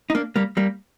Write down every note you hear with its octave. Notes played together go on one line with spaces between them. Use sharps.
D#4
A#3 D4
G3 A#3
G3 A#3